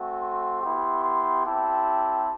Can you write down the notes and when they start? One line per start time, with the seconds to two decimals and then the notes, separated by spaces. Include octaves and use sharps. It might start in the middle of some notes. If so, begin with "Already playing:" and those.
Already playing: A3 C4 F#4
0.21 C6
0.62 B3 E4 G4
1.04 C6
1.45 C4 E4 G4 A5